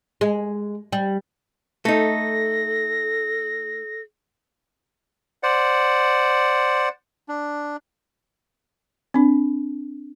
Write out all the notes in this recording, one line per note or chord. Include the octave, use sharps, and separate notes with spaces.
G#3
G3
A3 D#4 A4 A#6
C5 D5 F#5
D4
C4 D4